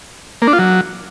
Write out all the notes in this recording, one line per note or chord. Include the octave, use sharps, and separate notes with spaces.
A#3
D4
F4
F#3